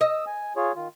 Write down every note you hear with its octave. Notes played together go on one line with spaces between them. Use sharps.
D#5 D#6 E6
G#5
F4 G#4 C#5
D#3 F4